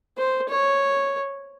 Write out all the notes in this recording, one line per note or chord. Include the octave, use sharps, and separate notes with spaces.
C5
C#5